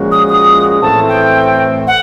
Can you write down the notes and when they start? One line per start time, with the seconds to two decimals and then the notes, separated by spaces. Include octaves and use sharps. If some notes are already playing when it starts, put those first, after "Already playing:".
Already playing: A#2 F3 G#3 C#4 F#4
0.11 D#6
0.29 D#6
0.81 A2 E3 A3 C4 A5
1.08 G5
1.87 F#5